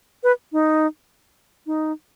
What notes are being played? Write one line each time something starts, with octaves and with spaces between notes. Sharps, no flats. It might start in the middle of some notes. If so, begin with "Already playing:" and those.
B4
D#4
D#4